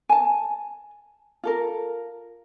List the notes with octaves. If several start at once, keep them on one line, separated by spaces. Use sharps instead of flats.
G#5 A5
F4 A4 A#4